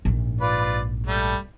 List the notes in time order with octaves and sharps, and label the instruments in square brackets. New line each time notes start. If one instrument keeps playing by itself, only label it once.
[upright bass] A#1 G#2
[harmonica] F4 B4 D5
G3 A3